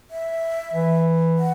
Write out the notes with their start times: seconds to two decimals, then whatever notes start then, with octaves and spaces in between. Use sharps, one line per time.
0.11 E5
0.73 E3
1.38 F#5